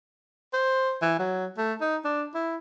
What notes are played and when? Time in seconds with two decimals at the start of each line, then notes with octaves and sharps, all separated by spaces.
0.53 C5
1.02 E3
1.19 F#3
1.58 A3
1.81 D#4
2.05 D4
2.35 E4